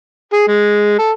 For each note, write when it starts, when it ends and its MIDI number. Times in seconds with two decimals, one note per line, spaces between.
0.33 0.45 68
0.48 0.94 56
0.99 1.11 69